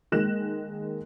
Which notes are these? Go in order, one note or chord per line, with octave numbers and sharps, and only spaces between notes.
D#3 G#3 A#3 F#6 A#6 E7